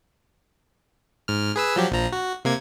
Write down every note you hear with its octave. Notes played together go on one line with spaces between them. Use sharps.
G#2 F6
G#4 B4 E6
F3 F#3 G4
A#1 F3 A#5
F#4
C3 A#3 G#6